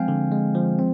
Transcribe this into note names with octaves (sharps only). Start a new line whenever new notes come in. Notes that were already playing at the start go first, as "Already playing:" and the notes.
Already playing: F3 G#3 C4 F5 G5 G#5
D3
G#3
F3
C4